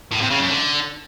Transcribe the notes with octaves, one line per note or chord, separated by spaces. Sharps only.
A2
C3
C#3
F#2
D3